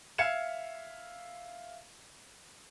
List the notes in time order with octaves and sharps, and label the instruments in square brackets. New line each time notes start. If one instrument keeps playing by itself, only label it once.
[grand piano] E5 F5 G#6 C#7 E7